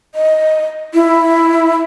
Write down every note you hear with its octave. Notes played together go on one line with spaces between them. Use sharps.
D#5
E4